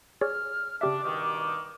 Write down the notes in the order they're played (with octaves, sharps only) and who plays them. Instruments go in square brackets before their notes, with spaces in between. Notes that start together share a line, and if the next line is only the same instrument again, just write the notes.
[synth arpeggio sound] G#4 C#5 D5 [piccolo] F6
[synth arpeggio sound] C#3 G4 E5 [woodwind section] D4 [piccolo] D6
[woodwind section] G2 B2 D#3